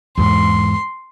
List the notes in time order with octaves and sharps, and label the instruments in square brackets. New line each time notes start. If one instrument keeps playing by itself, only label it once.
[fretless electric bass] E2 G#2 [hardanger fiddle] C6